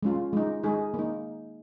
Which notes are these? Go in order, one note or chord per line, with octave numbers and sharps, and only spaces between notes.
G#3 C#4 F4
G#3 D#4
G#3 D#4 G#4
A#3 D#4